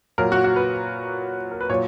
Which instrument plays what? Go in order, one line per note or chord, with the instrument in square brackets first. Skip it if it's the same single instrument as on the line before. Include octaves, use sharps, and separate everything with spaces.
[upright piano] A#2 F#3 A#4
F#4
F#4
B4
A#4
B4
A#2 F#3 C#5